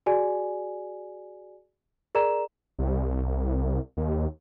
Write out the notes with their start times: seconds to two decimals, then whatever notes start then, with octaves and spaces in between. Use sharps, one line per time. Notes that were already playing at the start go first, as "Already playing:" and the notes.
0.06 F#4 G#4 D5 G#5
2.15 G#4 A#4 D5 A#5 E7
2.79 C2
3.97 D#2